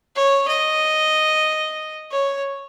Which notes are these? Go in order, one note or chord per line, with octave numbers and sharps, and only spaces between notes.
C#5
D#5
C#5